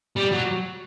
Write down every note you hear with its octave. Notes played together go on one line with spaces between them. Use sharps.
G3
F#3